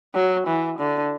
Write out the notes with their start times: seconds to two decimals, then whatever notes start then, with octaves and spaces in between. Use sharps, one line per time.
0.15 F#3
0.47 E3
0.78 D3